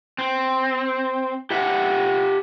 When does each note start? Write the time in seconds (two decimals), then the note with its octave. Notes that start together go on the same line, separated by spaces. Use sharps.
0.18 C4
1.50 G4 E5 F#5